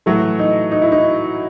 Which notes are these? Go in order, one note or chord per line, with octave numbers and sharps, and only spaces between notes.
A2 E3 F#3 A3 F#4
D#4
D#4
E4
D#4